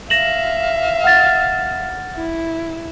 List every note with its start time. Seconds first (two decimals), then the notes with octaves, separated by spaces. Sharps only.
0.10 E5 F5 A#6 E7 F#7
1.04 F#5 F6 A6
2.15 E4